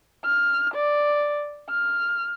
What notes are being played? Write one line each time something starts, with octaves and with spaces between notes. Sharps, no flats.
F6
D5
F6